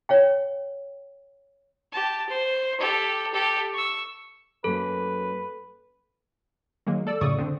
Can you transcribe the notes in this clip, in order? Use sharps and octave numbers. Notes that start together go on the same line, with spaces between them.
C#5 F5 G5
G4 A5
C5
G4 A4
G4 A4
C#6 E6
F#2 F#3 A#3 A4 B4
D#3 F#3 G#3 A#3
A4 D5 E6
F#2 A2 C#3 D5 C#6 D#6
D3 C4